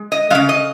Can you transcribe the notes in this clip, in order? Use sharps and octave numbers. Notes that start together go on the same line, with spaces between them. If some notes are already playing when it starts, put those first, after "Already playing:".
Already playing: G#3
D#5
C#3 G#3 F5
D#5